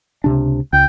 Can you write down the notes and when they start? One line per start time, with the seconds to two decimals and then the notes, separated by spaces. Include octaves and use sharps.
0.24 C#2 C3 D4
0.73 C#2 G5